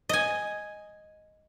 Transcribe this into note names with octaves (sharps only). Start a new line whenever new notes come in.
D#5 G#5